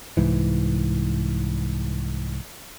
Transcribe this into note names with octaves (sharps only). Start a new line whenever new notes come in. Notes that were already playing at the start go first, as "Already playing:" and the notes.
C2 G#2 E3